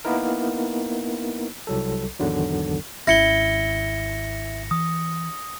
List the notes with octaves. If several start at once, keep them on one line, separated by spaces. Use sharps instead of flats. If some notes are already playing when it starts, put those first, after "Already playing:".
A#3 B3 D#4 E4 A#4
C2 F#3 A4
G#1 E2 D3 D#3 F#3
G#1 C#4 E4 A#6 C#7 G7
E3 D#6